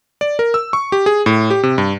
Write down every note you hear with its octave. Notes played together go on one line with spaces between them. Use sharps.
D5
A#4
E6
C#6
G4
G#4
A2
G4
C3
G2